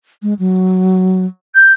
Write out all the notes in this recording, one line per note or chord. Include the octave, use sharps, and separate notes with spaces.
G#3
F#3
G6